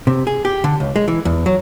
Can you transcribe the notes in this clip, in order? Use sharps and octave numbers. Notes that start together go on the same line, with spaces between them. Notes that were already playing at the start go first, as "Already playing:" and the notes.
C3
G#4
G4
D3
C#2
G#3
E3
E2
F#3